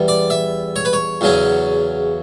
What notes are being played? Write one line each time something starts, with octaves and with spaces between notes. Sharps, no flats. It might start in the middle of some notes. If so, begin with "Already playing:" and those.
Already playing: E2 G3 B3 E4
D5
E5
C#5
B4
C#5
E2 C#3 F#3 C#4